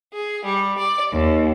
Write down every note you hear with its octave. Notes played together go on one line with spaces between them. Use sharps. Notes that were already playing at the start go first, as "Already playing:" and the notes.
G#4
G3
D5
D#2